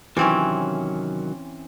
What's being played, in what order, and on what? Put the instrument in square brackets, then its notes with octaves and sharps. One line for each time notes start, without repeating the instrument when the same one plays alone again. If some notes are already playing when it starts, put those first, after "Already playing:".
[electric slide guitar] C3 D#3 F#3 [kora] E3 C4 C#4